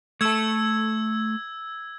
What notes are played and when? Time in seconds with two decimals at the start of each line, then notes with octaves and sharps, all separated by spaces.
0.21 A3 A4 E6 G#6